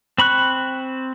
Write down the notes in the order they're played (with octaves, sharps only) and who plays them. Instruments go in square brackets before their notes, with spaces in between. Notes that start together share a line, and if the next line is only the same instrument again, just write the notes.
[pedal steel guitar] C4 B5 C#6 F#6